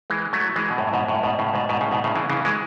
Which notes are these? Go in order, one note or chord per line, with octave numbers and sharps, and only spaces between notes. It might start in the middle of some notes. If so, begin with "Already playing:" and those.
E3 G#3
F#3 A3
E3 G#3
B2
F#2 A2
G#2 B2
F#2 A2
G#2 B2
A2 C#3
G#2 B2
G#2 B2
A2 C#3
G#2 B2
A2 C#3
C#3 E3
C#3 E3
E3 G#3